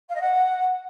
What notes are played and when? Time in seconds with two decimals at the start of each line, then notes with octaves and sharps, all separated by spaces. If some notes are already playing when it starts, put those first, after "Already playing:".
0.09 F5
0.14 D#5
0.20 F#5